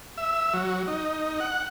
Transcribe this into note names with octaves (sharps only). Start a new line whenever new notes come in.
E5
F#3
D#4
F#5